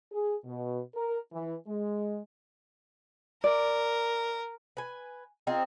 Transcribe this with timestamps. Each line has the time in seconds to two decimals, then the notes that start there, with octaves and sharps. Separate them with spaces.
0.12 G#4
0.45 B2
0.95 A#4
1.32 E3
1.67 G#3
3.44 A#4 D5
4.77 B4 G#5
5.47 C4 D#4 F4 G#4